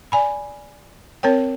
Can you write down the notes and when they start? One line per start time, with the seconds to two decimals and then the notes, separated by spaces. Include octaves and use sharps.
0.12 D5 G#5 B5
1.23 C4 A#4 C#5 G5